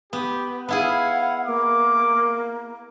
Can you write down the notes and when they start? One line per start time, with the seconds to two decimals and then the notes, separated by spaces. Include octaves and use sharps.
0.13 B3 G4
0.69 B3 E4 G#4 F5 F#5
1.47 A#3 D6